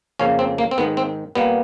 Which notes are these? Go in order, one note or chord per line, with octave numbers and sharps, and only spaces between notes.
F2 C#3 F3 A#3 C#4
C4
A#3
C4
G#2 D#3 G#3 B3
C4
A#2 G3 A#3 B3